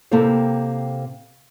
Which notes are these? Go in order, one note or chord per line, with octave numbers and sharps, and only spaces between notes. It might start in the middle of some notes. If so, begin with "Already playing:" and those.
C3 A#3 C4 E4 A4 C5